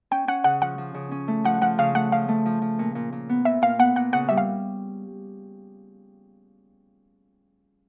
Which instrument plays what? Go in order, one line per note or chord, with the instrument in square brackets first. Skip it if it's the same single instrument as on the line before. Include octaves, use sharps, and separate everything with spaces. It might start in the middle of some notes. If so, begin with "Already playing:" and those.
[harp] C#4 [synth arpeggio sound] G5
[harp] C#4 [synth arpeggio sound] F#5
[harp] C#3 [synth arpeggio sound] F#5
[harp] F3 [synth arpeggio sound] F#5
[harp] F3
C#3
C#4
A3
[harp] F3 [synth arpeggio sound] F#5
[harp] F3 [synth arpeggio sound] F#5
[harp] C#3 [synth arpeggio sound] F5
[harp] A3 [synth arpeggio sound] F#5
[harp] F3 [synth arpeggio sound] F5
[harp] A3
F3
F3
A#2
A#2
A#2
B3
[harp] A#2 [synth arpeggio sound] E5
[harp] A#2 [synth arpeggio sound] F5
[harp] B3 [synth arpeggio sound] F#5
[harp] A#2 [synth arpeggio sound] F#5
[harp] C#3 [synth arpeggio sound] F#5
[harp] G3 [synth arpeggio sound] E5
[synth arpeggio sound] F5